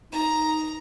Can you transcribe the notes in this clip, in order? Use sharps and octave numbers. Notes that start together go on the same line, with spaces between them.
D#4 A#5